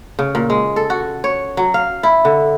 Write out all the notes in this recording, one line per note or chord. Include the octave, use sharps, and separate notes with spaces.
C#3
A#2
G#3
A4
F#4
C#5
F#3
F5
E4
D3